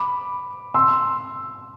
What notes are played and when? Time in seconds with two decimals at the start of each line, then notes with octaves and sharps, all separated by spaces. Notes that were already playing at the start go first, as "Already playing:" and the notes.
Already playing: B5 D6
0.74 C6 E6